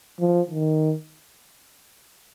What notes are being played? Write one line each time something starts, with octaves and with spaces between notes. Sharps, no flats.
F3
D#3